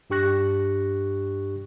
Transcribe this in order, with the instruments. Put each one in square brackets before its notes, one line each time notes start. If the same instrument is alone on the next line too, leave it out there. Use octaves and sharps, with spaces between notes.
[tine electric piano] G2 D4 G4 C#6 F#6 A#6